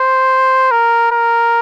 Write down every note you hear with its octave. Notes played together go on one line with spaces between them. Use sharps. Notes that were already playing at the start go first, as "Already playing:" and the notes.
Already playing: C5
A#4
A#4